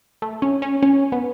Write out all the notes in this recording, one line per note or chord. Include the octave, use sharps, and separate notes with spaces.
A3
C#4
C#4
C#4
B3